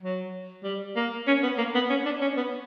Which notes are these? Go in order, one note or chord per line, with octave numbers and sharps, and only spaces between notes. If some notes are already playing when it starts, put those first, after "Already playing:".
F#3
G3
A#3
C#4
B3
A#3
B3
C#4
D4
C#4
B3